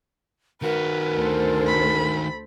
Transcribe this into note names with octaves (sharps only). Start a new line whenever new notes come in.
D#3 F#4 A#4 B4
D2 A4 C5
B5